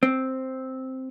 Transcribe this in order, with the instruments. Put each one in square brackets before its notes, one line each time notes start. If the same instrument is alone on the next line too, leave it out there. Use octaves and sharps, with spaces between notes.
[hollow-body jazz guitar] C4